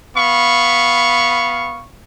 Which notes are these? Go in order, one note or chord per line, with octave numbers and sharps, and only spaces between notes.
B3 F5 B5 C#6